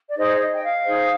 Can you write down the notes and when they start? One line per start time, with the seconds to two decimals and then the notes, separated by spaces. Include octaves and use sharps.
0.08 D5
0.17 D#4 G#4 C5 D#5
0.39 D#5
0.54 G5
0.62 F5
0.84 D#4 G#4 C5